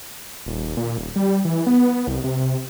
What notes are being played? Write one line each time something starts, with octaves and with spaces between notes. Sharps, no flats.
D#1
A#2
D#1
G3
E3
B3
C2
C3